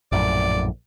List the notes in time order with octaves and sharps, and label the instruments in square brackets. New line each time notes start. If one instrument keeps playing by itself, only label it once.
[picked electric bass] A#1 F#2 A2 [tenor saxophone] D5